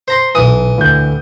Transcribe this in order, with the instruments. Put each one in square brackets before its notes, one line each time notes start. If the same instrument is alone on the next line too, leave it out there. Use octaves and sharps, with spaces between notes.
[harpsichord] C5 A#5 C6
[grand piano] B1 D#7 [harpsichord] E3 D#6
[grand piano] D2 A2 G6